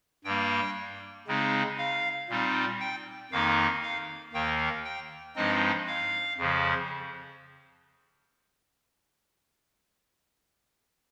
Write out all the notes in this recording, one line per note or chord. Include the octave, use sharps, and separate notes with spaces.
G2 G3 A#3 G5
C#3 G#3 C4 D#4
F5
A#2 G3 C4 D#4
G5
F2 D#3 A#3 D#4 F5
F5
D#2 D#3 A#3 G5
G5
G2 F3 G#3 C4 D#4 D#5
F5
F2 C#3 F3